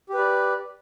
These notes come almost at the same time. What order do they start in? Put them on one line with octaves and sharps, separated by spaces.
G4 B4 D5